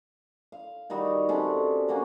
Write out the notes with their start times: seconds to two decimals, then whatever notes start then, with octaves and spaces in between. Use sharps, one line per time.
0.52 F5
0.90 D#3 G3 D#4 F#4
1.29 C3 C#4 D4 A4
1.88 F#3 A#3 C#4 D4